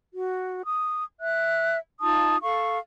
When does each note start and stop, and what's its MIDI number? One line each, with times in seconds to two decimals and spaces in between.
0.13 0.60 66
0.65 1.04 87
1.20 1.77 76
1.20 1.77 90
2.01 2.38 63
2.01 2.38 65
2.01 2.38 81
2.01 2.38 87
2.42 2.78 69
2.42 2.78 77
2.42 2.78 85